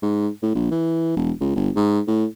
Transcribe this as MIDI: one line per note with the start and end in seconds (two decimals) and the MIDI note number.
0.02 0.28 44
0.42 0.50 45
0.55 0.67 34
0.71 1.16 52
1.16 1.31 28
1.40 1.54 37
1.55 1.70 31
1.76 2.00 44
2.07 2.25 45